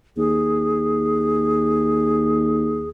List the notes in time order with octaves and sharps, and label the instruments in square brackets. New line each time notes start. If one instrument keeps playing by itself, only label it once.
[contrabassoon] D#2 [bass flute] G#4